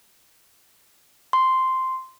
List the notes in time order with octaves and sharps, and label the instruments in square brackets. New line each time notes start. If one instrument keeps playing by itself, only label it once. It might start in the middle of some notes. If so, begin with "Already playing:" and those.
[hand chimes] C6